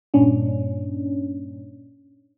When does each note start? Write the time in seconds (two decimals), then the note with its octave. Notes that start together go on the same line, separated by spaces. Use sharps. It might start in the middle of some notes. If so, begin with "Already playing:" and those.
0.14 G2 A#2 C#4 D4